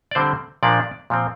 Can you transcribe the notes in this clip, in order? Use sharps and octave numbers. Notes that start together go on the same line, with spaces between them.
D5
D3 G3 C4 C5
A#2 F3 A#3 D4 D5
A#2 F3 C4